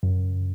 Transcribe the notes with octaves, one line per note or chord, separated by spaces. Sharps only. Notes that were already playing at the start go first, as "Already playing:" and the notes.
F#2